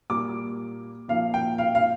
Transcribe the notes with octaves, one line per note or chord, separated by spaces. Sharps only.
A#2 G3 A#3 D6
A#2 F3 A#3 F5
G5
F5
F5